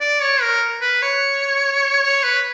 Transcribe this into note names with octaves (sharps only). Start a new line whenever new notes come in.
D5
C#5
A#4
B4
C#5
C#5
B4